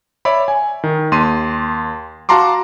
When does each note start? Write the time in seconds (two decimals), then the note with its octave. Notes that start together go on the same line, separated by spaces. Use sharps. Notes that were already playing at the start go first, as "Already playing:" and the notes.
0.25 C#5 D5 E5 B5
0.48 G#5
0.84 D#3
1.12 D#2 C6 D#7
2.29 F#4 F5 A5 A#5 C6 D6